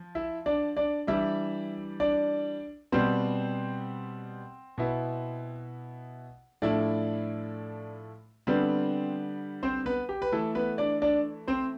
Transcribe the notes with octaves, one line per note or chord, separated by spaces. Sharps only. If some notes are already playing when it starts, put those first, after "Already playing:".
Already playing: F3
E4 E5
D4 D5
D4 D5
E3 G3 D4 E4 E5
D4 D5
B2 G3 B3 C4 C5
B2 B3 E4
A2 F3 A3 D4 E4 D5
D3 G3 B3 C4 C5
C4 C5
B3 B4
G4
B4
E3 A3 E4 A4
B3 B4
D4 D5
D4 D5
C4 C5